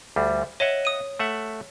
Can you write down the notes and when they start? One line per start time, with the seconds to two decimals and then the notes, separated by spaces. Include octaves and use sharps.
0.16 D2 G3
0.60 C#5 D#5 E5 F#5
0.85 D#6 D#7
1.19 A3 E5 F#5